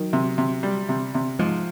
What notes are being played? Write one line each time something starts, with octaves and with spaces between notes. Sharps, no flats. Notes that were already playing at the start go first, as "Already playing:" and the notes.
Already playing: D#3 F#3
C3
C3
G3
C3
C3
G#2 F3